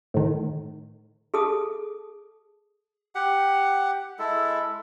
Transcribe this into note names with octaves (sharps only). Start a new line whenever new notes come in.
A2 D#3
G#4 A4 A5 D#6
G4 F#5
G#3 E4 A4